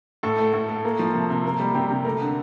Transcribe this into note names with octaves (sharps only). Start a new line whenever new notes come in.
A2 A4
A3
A2
A3
A#3
F3
C3
C3
A#3
G3
C3 G4
C3
A3 A#4
D3